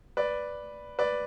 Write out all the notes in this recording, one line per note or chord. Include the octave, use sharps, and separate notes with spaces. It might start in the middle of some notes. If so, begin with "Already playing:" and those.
B4 D5
B4 D5